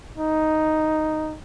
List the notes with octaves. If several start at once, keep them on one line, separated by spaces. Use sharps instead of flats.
D#4